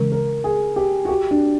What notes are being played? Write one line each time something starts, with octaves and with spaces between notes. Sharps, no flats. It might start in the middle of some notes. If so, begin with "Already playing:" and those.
Already playing: C#3 E3 G#3 C#4 A#4
A#4
G#4
G4
F#4
G4
D4